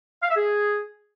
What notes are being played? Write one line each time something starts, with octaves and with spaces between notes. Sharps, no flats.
F5
E5
G#4